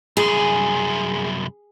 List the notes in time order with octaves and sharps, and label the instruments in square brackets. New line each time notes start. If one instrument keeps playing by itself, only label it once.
[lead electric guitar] C2 F#2 [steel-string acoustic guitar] G#4